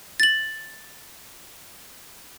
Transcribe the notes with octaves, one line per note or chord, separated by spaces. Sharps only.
A6 F#7